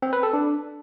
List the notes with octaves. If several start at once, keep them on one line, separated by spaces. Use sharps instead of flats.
C4
B4
A4
D4